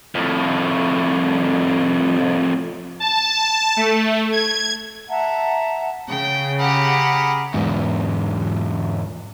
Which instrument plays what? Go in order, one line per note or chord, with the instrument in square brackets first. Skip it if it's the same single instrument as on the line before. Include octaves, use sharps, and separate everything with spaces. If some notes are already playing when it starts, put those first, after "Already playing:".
[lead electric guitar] F2 A2
[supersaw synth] A5
A3
G#6
[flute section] E5 F#5 A5 A#5
[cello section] C#3 [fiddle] G5
[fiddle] G4 F#5 [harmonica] G#4 A#4 B5
[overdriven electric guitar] E2 G#2